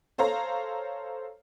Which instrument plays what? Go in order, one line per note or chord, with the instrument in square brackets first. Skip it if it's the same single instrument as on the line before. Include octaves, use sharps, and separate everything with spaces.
[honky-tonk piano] A4 C5 C#5 F5 A#5